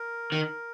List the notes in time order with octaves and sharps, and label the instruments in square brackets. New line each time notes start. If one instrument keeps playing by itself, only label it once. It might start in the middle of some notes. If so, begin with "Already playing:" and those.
Already playing: [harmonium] A#4
[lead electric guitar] D#3